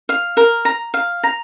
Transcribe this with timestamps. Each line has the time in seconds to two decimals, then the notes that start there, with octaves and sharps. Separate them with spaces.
0.09 F5
0.37 A#4
0.65 A#5
0.94 F5
1.24 A#5